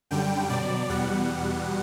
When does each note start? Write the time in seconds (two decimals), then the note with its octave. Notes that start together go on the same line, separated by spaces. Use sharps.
0.11 F#2 D3 G3 G5
0.50 B2 F#3 D5
0.89 E2 B2 G3 F#5